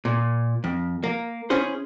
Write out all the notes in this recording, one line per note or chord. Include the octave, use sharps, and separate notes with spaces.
A#2
F2
A#3
C#4 E4 G#4 C5